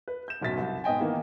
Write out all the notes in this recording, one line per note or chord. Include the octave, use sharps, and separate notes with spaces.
B4
G6 E7
D1 B1 F#2 A6 B6
C2
G#2 B3 D#5 G5 G#5
D#3 E3 A#3 B3